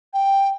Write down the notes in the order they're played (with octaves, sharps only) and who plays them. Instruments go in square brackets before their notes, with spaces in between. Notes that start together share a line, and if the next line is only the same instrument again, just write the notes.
[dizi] G5